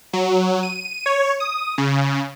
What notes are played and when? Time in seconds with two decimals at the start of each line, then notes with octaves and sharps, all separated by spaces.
0.13 F#3
0.63 D#7
1.06 C#5
1.40 D#6
1.78 C#3